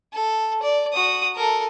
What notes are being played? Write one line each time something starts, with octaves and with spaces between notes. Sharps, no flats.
A4
D5
F#4 D#6
A4 A#4